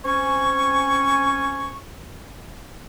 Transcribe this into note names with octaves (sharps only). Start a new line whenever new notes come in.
C4 C#4 G#5 C#6